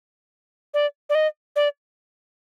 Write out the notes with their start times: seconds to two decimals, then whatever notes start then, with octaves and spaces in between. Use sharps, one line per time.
0.74 D5
1.10 D5
1.15 D#5
1.56 D5